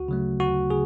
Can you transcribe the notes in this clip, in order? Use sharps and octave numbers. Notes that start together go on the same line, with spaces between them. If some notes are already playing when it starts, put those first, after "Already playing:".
Already playing: D2 F#4
C#3 F#3 A3
D2 F#4
C#3 G#4